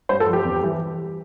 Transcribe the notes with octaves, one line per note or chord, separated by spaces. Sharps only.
G2 C5
A4
F3
G4
E2
E3 G3